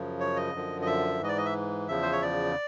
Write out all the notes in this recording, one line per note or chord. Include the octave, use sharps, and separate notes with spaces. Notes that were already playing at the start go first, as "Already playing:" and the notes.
Already playing: F#2 C#3 F3
C#5
D#5
F#2 D3 F3
D#5
E5
G#2 E3 D#5
D5
D#5
E5
E2 C#3 F3 E5
C5
C#5
D5